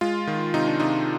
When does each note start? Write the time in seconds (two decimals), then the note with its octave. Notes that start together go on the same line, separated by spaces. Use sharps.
0.01 G#3 F4
0.27 D#3
0.54 C3 D#4
0.67 D4
0.80 C3 D#4